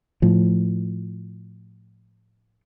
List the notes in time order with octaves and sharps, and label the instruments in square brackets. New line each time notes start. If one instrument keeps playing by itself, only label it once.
[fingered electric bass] A2 F3